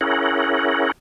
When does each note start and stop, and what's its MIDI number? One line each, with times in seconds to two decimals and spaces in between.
0.01 0.92 61
0.01 0.92 64
0.01 0.92 68
0.01 0.92 70
0.01 0.92 78